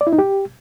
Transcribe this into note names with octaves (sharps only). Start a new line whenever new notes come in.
D5
E4
D#4
G4